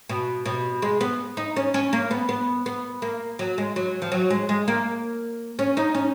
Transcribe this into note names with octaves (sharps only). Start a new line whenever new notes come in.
B2
B2
G#3
B3
D#4
C#4
C#4
A#3
B3
B3
B3
A#3
F#3
G#3
F#3
F3
F#3
G#3
G#3
A#3
C#4
D#4
C#4